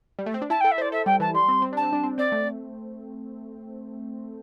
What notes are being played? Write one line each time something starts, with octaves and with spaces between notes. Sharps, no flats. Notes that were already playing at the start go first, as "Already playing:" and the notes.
G3
A3
C4
D4
E4 A5
G5
A4
E5
C5 D5
A4 E5
G3 G5
E3 A5
G3 C6
C4
C4
D4 A5
C4
D4
C4
C4 D5
A3